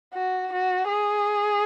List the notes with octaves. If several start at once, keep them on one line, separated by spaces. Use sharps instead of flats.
F#4
F#4
G#4